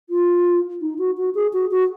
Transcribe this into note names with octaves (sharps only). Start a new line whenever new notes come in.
F4
D#4
F#4
F#4
G#4
F#4
F#4